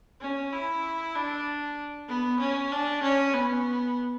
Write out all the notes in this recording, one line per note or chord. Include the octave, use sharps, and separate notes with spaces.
C#4
E4
D4
B3
C#4
D4
C#4
B3